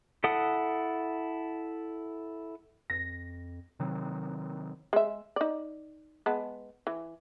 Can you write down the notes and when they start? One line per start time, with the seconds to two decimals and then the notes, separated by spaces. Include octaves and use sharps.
0.24 E4 A4 F#5 D#6
2.90 F2 A#6
3.80 C3 D#3 F#3
4.93 G#3 E5
5.36 D#4 D5
6.26 G#3 B3 A5
6.87 E3